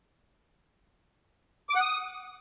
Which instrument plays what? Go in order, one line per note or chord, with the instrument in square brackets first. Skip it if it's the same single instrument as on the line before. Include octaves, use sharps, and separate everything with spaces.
[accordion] D6
F#5
D#6